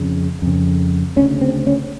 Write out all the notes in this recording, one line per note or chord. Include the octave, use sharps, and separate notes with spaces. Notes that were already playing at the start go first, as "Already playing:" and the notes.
Already playing: F2 C#3
F2 C#3
D2 C#3 C#4
C4
C#4